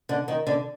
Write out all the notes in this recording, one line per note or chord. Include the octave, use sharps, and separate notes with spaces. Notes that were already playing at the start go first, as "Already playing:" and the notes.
D3
D#3
D3